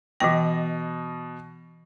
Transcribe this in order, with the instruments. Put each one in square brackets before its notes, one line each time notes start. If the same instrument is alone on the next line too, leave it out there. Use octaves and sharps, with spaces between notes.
[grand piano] B2 A#6 [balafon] E3 G5